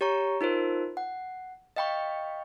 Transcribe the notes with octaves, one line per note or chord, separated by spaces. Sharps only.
G4 C#5 A#5 C#6
D#4 F4 A#4 C5
F#5
D#5 F5 G5 B5 C#6